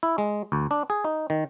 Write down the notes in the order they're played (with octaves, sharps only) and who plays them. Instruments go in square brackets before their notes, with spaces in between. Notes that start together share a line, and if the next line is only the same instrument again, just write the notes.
[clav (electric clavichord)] E4
G#3
D2
D4
G#4
D#4
D#3